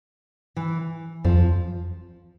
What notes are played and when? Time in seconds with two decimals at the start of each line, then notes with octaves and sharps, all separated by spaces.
0.56 E3
1.24 F2 F3